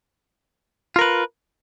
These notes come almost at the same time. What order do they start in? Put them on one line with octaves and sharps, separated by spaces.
F4 A#4 B4